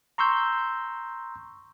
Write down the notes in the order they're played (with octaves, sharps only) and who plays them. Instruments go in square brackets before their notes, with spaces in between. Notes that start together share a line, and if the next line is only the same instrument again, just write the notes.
[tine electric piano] A#5 C6 C#6 E6 G6